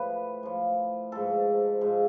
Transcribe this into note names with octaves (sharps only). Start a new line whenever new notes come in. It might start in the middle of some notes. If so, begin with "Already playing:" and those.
Already playing: A2 F3 B4
A2 F3
G#2 F3 A4
G#2 F3